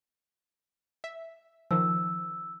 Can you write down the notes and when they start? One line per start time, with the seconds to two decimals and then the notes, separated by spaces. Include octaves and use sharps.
1.04 E5
1.71 D#3 F3 E6